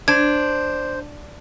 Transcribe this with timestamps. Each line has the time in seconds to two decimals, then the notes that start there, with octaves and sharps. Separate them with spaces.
0.08 D4 C5 G#6